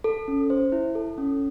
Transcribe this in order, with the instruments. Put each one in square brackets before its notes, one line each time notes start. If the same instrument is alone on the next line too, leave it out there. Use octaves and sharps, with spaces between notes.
[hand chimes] A4
C#4
C5
E4
A4
C#4